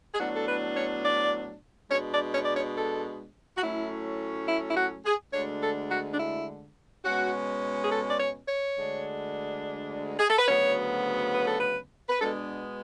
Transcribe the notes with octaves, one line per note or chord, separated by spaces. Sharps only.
G#4
A2 F#3 B3 D4 F#4
A4
B4
C#5
D5
B2 G#3 D4 C#5
D5
C#5
D5
C#5
A4
F#4
A2 F#3 A3 C#4 E4
E4
E4
F#4
G#4
D2 D3 G#3 D4 C#5
A4
F#4
D4
E4
B2 G#3 C#4 F#4
G#4
A4
D5
C#5
C#5
D2 D3 G#3 D4
G#4
A4
B4
D2 C#3 F#3 B3 C#5
B4
A4
B4
B4
B2 G#3 B3 D4 A4